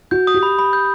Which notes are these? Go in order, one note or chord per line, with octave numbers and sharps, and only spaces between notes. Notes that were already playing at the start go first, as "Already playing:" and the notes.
F#4 G6
D#6
G4
B5
B5
G6